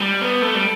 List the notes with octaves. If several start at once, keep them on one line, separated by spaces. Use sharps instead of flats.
G3
B3
A3
G3